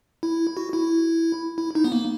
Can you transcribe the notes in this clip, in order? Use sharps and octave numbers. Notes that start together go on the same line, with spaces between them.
E4
F#4
E4
E4
D#4
B3
A#3